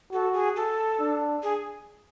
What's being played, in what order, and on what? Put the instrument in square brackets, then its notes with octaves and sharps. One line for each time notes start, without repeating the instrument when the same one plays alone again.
[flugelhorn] F#4 [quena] A4
[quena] G#4
A4
[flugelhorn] D4
[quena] G#4